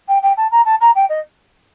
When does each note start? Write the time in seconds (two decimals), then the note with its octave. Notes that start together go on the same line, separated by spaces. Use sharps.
0.09 G5
0.23 G5
0.37 A5
0.51 A#5
0.66 A5
0.81 A#5
0.95 G5
1.09 D#5